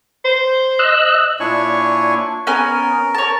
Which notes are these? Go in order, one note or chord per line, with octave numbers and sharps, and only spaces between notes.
C5
D#5 E6 F#6
A#2 D4 E4 C#5 G#5 C#6
B3 C#4 A#4 G#5
C#5 A5